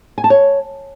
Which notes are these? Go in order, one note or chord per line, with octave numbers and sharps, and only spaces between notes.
G#5
A5
C#5